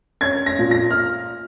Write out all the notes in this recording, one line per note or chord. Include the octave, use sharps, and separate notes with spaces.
C#4 G#6
A#6
A#2
A#6
F6